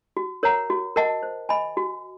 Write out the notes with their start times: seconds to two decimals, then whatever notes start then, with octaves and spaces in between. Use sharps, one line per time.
0.17 F#4
0.43 A#4 C#5 F#5 A#5
0.70 F#4
0.96 A#4 D#5 F#5 A5
1.23 C5
1.49 D#5 G#5 B5
1.77 F#4